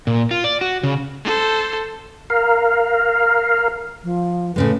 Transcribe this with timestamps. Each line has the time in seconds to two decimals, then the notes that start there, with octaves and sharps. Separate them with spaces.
0.07 A#2
0.31 F4
0.44 D5
0.61 F#4
0.83 C#3
1.24 A4 C5
2.30 A#4 F5
4.04 F3
4.56 A2 C#3 G#3 B4